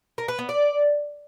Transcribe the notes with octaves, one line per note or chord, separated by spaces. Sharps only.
A#4
B4
B3
D5